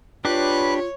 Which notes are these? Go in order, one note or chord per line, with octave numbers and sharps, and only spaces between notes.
D4 F4 G4 B4 C#5 B5 F#6